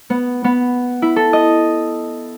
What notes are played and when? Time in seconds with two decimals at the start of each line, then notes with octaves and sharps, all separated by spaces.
0.10 B3
0.44 B3
1.02 E4
1.16 A4
1.33 D#5